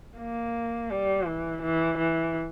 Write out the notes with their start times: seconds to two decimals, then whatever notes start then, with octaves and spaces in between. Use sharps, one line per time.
0.18 A#3
0.91 G3
1.26 E3
1.63 E3
1.98 E3